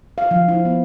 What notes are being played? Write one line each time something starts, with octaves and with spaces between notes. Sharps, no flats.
F5
F3
E4
B3